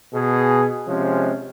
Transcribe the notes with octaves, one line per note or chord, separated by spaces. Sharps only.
B2 G#4
C3 F3 G#3 C#4